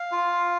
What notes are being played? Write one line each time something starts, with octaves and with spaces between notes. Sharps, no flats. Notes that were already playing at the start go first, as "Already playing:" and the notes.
Already playing: F5
F4